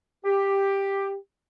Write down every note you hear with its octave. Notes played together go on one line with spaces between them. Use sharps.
G4